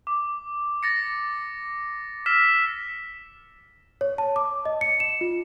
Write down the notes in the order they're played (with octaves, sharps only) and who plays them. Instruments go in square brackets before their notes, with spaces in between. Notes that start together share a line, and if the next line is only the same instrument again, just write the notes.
[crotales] D6
A6 A#6 C#7
E6 F6 A#6 B6 E7
[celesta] C#5
A5
D6
D#5
C#7
E7
F4